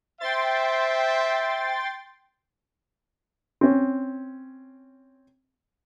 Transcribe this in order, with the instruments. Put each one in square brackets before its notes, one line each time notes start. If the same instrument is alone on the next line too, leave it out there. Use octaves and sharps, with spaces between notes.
[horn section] C5 E5 [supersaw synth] G5 C6 A6
[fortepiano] C4 C#4